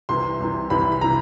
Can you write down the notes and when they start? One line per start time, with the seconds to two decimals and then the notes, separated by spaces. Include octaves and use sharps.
0.09 C2 C3 E3 C6
0.40 C2 C3 E3
0.70 C2 C3 E3 B5
0.82 B5
0.92 B5
1.01 C3 E3 A#5